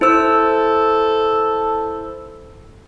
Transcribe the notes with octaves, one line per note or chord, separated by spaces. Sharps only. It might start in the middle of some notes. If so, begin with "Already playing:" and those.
E4 A4 C5 E6